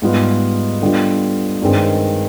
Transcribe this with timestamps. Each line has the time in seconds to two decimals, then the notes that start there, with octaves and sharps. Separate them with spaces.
0.02 G#2 G3 B3 F4
0.82 D3 G3 B3 F4
1.62 G2 D#3 G#3 C4